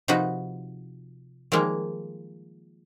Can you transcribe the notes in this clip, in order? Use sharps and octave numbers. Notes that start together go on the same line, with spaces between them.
C3 F3 D#4 F#4 B4
D#3 F3 G3 G#3 A#3